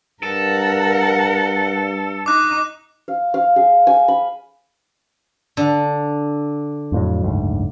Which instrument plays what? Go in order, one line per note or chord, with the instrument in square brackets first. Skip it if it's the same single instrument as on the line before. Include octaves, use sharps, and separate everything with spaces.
[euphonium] G2 [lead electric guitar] A4 [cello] A#4 F#5
[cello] D#4 [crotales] D6 F#6
[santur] F5
F5
G#4
G#5
B5
[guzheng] D3
[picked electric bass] F2 A2 F#3
F#1 D2 G#2